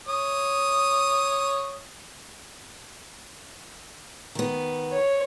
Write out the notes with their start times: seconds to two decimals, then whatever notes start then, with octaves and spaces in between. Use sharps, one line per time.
0.07 C#5 D#6
4.35 D#3 B3
4.92 C#5